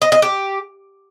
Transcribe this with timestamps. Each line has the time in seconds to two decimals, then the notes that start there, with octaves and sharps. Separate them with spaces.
0.02 D#5
0.12 D#5
0.22 G4